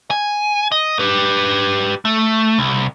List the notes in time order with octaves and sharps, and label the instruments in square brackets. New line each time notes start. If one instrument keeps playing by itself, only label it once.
[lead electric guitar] G#5
D#5
G4 B4
A3
C2